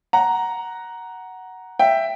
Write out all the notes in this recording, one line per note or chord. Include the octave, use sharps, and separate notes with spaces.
F#5 A#5
E5 G5